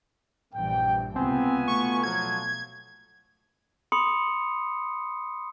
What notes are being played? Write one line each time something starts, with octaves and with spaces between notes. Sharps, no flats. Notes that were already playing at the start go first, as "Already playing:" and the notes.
A#1 G2 E3 G5
C#2 C3 B3 C4 F4 G#5
B2 A3 C#6
F3 F#3 G#6
B5 C6 D#6 C#7